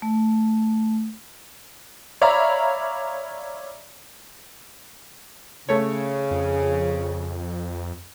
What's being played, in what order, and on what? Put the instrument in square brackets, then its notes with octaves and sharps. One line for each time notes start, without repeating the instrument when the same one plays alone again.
[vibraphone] A3
[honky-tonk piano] C#5 D5 E5 F5 A#5 B5
[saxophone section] C#3 [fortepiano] A3 C#5
[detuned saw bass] F2